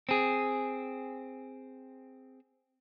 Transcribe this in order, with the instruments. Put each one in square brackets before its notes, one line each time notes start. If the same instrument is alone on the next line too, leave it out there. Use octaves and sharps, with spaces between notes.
[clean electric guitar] C4 G#4